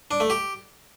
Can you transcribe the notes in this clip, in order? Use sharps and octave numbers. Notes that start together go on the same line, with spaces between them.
D4
A3
G4